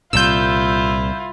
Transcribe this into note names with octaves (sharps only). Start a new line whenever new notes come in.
C2 A#2 E4 F4 E6 G6